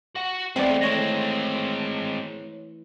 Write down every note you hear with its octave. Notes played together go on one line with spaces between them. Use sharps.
F#4 F#5
E3 G#3 A3 B3 C4 E4 D5
G#3 C4 C#5 A#6